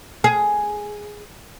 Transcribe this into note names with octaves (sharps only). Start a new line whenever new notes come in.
G#4